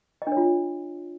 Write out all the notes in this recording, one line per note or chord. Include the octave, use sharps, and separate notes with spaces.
D#5
D4
C#5
F4